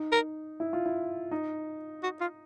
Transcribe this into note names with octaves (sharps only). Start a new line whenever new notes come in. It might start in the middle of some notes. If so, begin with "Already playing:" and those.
Already playing: D#4
A#4
E4
F4
E4
D#4
F#4
F4